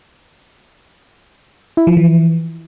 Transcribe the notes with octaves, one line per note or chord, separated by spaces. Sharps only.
E4
F3
E3